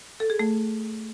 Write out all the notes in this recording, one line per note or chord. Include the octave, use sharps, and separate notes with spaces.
A4
G#4
A3